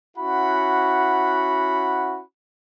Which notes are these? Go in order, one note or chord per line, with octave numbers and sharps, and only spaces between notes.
C#4 E4 F#4 F#5 B5